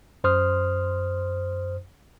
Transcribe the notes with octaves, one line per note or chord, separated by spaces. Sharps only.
F#2 C5 C6 D#6 F6